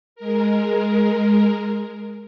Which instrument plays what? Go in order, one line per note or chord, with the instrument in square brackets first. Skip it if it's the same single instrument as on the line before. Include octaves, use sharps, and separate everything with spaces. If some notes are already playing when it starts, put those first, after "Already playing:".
[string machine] G#3 A#4